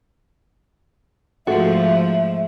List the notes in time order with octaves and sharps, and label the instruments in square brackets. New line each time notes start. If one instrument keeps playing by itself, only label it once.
[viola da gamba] G#2 F3 A3 [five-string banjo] F#4 A4 [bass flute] E5